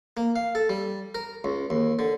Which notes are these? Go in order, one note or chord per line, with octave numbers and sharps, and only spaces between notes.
A#3
F5
A4
G3
A#4
C#2
D#2
D3